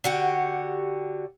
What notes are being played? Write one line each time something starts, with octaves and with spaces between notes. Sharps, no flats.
D3 F#4 G4